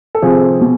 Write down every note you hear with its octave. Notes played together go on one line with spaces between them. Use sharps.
A4
C3 F3 G#4
B2